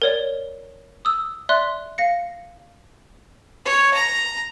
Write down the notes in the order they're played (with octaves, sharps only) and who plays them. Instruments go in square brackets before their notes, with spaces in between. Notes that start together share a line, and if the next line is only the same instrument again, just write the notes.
[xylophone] A#4 C#5 D5
D#6 E6
D5 E5 C6 F#6
F5 A#6 C#7
[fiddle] C#5
A#5